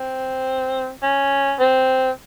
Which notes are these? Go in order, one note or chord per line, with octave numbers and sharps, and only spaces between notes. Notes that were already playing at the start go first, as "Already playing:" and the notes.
Already playing: C4
C#4
C4